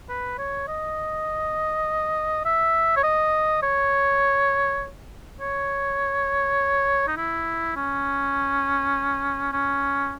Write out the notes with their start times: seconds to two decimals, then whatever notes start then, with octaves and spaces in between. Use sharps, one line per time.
0.09 B4
0.38 C#5
0.68 D#5
2.45 E5
2.96 C#5
3.03 D#5
3.62 C#5
5.40 C#5
7.07 D#4
7.17 E4
7.76 C#4
9.53 C#4